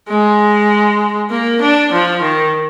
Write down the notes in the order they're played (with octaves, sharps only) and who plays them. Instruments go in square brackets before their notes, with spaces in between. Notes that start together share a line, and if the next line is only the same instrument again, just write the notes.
[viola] G#3
A#3
D4
F3
D#3